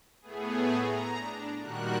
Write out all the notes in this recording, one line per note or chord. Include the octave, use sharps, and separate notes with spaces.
A2 A3 B3 G#4
A#5
D4
A#2 D#3 G3 F#4 A#4 F#6